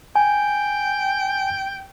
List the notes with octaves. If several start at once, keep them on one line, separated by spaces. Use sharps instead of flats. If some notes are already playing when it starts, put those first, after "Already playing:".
G5 G#5